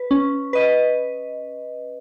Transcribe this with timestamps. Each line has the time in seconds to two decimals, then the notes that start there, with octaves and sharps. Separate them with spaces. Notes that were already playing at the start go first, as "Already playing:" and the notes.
Already playing: B4
0.11 C#4
0.53 B4 D#5